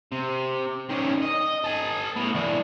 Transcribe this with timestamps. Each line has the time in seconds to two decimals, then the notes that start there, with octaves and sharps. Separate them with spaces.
0.12 C3
0.90 D#3 C#4
1.22 D#5
1.64 A4 G#5
2.16 A2 B3
2.35 E3 D4